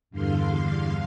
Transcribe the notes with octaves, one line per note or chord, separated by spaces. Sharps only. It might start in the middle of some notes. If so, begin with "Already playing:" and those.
E2 G2 D3 F5 C6